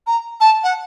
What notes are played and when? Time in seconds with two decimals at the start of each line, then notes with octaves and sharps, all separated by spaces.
0.07 A#5
0.40 A5
0.63 F#5